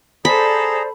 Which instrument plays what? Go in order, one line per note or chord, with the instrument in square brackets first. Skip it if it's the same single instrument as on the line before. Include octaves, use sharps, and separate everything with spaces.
[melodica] G#4 A#5 [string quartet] A4 [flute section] C5 D5 [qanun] B5